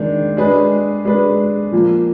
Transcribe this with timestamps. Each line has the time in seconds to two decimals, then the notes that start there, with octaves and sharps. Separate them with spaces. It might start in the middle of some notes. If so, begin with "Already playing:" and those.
Already playing: D#3 G#3 D4
0.37 G#3 D4 G#4 B4
1.05 G#3 D4 G#4 B4
1.72 A#2 F3 A#3